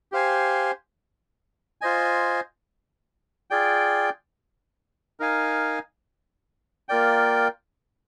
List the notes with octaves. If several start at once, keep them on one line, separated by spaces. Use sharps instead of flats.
G4 C5 F5 G#5
F4 C5 D#5 G#5
F4 G#4 D5 G5
D#4 A#4 F5 G#5
A#3 F4 A#4 D5 G5